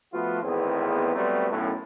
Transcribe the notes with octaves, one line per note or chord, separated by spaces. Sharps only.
F3 A3 B3 F4 F#4
G#1 E2 A2 B3 C4 G#4
F#3 G3 A3 B3 C4
B1 F#2 A2